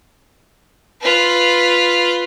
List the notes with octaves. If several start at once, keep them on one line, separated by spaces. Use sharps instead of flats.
F4 B4